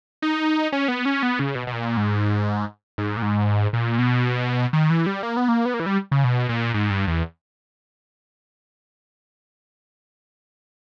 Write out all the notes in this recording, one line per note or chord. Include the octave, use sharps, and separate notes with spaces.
D#4
C#4
B3
C#4
B3
C#3
B2
B2
A#2
G#2
G#2
A#2
G#2
A#2
B2
D#3
E3
G3
A#3
B3
A#3
B3
A#3
E3
G3
C#3
B2
A#2
G#2
G2
E2